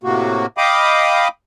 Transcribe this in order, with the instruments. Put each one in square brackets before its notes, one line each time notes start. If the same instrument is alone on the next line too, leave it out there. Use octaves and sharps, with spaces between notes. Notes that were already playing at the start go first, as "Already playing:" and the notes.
[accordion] A2 C3 A#3 F#4
D#5 F5 G5 B5 D6 D#6